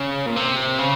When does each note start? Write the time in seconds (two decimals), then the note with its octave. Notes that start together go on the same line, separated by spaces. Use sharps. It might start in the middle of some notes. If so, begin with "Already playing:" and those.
Already playing: C#3
0.26 A#2
0.36 C3
0.79 C#3